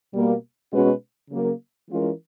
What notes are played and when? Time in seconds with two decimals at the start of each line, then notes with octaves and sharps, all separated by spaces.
0.13 B2 G3 A#3
0.71 B2 G#3 C#4 F#4 B4
1.30 C#3 F#3 A#3
1.90 E3 G#3 C#4 F4 A#4